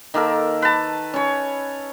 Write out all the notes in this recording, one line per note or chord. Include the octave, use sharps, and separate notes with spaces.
D#3 A#3 A4 A#4
B4 A5
C#4 C#5